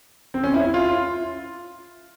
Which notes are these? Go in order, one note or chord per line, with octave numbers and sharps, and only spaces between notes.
C4
C#4
E4
E4
F4